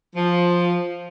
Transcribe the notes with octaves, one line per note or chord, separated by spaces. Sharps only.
F3